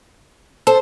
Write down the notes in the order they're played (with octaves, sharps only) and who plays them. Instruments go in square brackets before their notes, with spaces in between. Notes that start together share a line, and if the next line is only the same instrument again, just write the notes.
[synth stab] A4 [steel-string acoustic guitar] C5